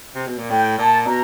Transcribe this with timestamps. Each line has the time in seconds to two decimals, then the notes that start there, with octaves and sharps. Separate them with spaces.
0.15 C3
0.27 B2
0.39 A#2
0.50 A2 G5
0.78 A#2 A5
1.06 B2 A#5